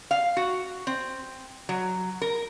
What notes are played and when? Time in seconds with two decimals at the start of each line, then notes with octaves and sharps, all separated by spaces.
0.11 F5
0.37 F#4
0.87 C4
1.69 F#3
2.22 A#4